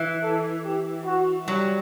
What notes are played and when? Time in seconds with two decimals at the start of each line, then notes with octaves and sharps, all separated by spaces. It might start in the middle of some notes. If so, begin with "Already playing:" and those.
Already playing: E3
0.23 A4
0.65 G4
1.06 F#4
1.48 F#3 G3